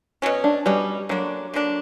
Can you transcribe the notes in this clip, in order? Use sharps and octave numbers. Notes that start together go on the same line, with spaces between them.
B2 F#3 C#4
D4
B2 F#3 G3 C#4
D3 F#3 A#3 D4
D3 A#3 D4